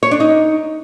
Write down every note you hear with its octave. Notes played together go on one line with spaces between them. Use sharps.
C#5
D4
D#4